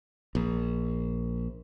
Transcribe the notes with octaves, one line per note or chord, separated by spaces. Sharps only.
A#1